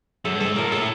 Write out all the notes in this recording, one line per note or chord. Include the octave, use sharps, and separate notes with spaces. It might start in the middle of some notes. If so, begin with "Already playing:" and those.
F#2 A4
G2
A4
G#2
A2 A#4
A#2
A2 A4